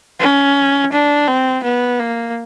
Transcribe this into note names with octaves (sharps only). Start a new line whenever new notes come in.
C#4
D4
C4
B3
A#3